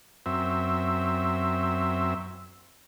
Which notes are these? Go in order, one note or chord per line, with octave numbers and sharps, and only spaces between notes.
F#2 C4 E5